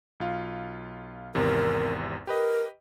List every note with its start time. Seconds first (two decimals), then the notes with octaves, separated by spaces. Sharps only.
0.20 B1 F4 F5
1.35 G#1 E2 C3 A#4
2.27 G4 A#4 B4 D#5